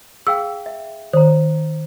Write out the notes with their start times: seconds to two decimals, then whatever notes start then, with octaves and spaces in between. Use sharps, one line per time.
0.27 G#4 F5 G5 E6
0.66 E5
1.13 D#3 C5 A#5